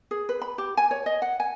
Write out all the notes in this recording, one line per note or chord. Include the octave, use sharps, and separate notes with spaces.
G#4
B4
B5
G4
G#5
C#5
D#5
F#5
G#5